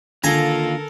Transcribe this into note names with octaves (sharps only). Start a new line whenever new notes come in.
D#2 D3 F4 A4 A#4 G#5 A#5